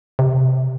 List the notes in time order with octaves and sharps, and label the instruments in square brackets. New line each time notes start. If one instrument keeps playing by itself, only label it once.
[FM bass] C3